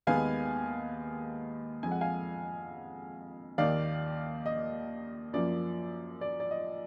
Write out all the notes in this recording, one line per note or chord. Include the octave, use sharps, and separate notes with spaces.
D#2 D#3 G#3 B3 F5 G#5
F2 F3 G#3 G#5
F#5
F5 G#5
D#2 D#3 A#3 D5 F5
D#5
F#2 F3 A#3 D5
D5
D5
D#5